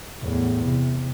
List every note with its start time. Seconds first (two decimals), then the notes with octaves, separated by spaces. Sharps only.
0.19 E2 A2
0.64 C3